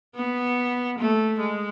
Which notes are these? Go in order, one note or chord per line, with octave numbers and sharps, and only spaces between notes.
B3
A3
G#3